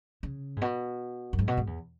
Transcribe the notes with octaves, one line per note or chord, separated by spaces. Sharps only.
C#3
G#2
B2
F#2
G#2
B2
G#2
E2